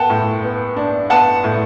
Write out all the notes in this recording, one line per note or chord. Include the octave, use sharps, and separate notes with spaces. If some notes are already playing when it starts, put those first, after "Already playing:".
Already playing: B3 F#5 G5 A5
A2
B3
D4
B3 F#5 A5
A2